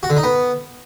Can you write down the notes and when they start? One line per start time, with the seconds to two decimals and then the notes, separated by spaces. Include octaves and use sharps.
0.03 F#4
0.10 D3
0.17 D#4
0.23 B3